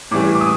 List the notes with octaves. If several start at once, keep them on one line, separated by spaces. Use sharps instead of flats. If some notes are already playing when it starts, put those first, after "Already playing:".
A2 E3 G3 D6
D6
D#6